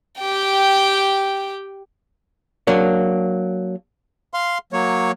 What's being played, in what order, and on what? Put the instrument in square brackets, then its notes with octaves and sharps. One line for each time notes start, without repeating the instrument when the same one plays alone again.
[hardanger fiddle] G4 G5
[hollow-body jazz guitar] F#3 A#3 D4
[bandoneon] F5 C6
F#3 A#3 C#5